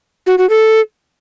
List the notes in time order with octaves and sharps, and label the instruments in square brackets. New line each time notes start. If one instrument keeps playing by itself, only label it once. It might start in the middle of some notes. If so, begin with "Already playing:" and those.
[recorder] F#4
F#4
A4